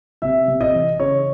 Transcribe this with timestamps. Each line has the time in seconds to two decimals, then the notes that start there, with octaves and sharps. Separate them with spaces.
0.22 C3 E5
0.48 C3
0.61 D#5
0.75 E3
0.99 C#3 C#5